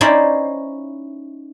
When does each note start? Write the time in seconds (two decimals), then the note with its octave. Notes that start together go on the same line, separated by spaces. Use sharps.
0.01 C#4 D#4 E4 C5 D5